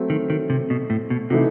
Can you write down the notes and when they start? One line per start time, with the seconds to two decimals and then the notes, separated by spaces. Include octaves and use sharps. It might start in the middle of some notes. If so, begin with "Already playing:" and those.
Already playing: F#3 A3 C4
0.10 D#3
0.30 D#3
0.50 C3
0.70 B2
0.90 A2
1.10 B2
1.30 C3 E3 A3 D#4 F#4